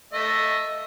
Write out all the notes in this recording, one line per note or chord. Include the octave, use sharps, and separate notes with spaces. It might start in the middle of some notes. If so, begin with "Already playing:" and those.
A3 D#5 E5